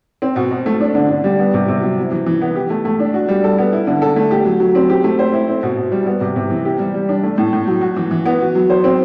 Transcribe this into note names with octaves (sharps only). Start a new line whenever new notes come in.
C4
B2
B2
A3
D4
D3
D3
G3
B3
C3
C3
F#3
E4
E3
E3
B3
G4
A3
A3
D4
F#4
G3
A4
B3
E4
D3
A4
A3
G4
F#3
F#3
C4
G4
A3
C5
E4
C4
B2
B2
G3
B3
C3
C3
E3
G4
G3
G3
D4
A3
A2
A2
F#3
F#4
E3
E3
B3
F#4
F#3
C5
C4